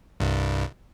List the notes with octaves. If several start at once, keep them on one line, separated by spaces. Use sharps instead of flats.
C2 G2